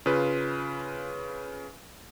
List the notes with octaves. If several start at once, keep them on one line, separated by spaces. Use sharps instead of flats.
C#3 F4 B4